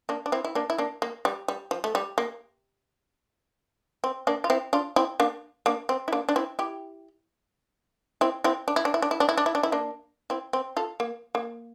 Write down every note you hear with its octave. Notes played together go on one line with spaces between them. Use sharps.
A#3 D4
D4
C4 E4
E4
A#3 D4
E4
A#3 D4
A#3
G3
G3
F3
A3
G3
A#3
C4
A#3 D4
F4
C4 E4
D4 F4
C4 E4
A#3 D4
A#3 D4
C4
E4
A#3 D4
D4
C4 E4
E4 G4
C4 E4
C4 E4
D4
E4
D4
E4
D4
E4
D4
E4
D4
E4
D4
E4
A#3 D4
C4 E4
C4
F4 A4
A#3
A#3